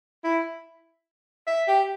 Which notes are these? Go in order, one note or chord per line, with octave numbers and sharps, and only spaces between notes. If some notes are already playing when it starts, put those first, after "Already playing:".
E4
E5
G4